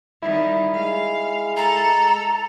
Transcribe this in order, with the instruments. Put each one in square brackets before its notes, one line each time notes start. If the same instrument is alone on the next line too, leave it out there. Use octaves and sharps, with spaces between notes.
[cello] D#3 G3 [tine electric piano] E4
[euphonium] G#3 [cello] F5
[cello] A4 [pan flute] A#5